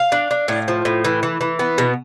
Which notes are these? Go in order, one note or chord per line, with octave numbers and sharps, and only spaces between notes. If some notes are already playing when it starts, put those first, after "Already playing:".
Already playing: F5
D4
D4
A2
F3
A2
E3
E3
E3
B3
B2